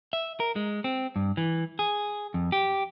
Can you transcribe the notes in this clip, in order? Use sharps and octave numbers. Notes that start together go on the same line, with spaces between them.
E5
A#4
G#3
C4
G2
E3
G#4
F2
G4